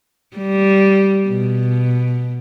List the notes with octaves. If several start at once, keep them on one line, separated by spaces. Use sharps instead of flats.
G3
B2